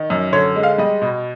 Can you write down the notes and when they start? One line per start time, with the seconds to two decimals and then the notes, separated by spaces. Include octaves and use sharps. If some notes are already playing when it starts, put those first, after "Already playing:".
Already playing: D#3
0.10 F#2
0.33 D3 C#5
0.56 G#3
0.63 F5
0.78 G3 D#5
1.02 B2